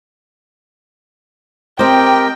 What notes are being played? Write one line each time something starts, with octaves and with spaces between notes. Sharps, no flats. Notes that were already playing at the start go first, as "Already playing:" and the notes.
C4 G4 A#4 C5 D#5 G5